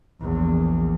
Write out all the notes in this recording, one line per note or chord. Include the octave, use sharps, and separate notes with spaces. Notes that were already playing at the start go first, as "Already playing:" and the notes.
A#1 E2